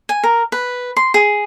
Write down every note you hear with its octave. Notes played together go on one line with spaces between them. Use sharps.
G#5
A#4
B4
C6
G#4